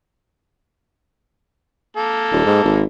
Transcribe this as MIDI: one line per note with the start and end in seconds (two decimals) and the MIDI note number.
1.97 2.83 58
1.97 2.83 69
2.32 2.44 27
2.46 2.61 44
2.64 2.84 32